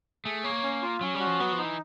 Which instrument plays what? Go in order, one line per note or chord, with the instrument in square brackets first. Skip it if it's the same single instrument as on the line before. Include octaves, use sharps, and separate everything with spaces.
[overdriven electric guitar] A3 [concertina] G#4
[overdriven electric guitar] A#3 [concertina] C#5
[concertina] C#4
F4
[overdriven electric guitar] F#3 [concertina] C#4
[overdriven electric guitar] G3
[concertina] F#4
[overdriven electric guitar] F3
[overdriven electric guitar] F#3 [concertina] B3
[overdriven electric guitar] F3
[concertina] D#4
[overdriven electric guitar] E3